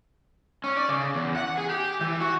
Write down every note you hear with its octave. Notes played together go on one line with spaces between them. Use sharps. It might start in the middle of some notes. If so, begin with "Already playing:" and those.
C#4
D5
C#3
E2
F#5
G#4
G4
E3
F#4